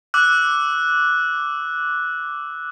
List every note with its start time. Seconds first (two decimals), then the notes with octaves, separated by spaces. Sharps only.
0.14 D6 E6 F#6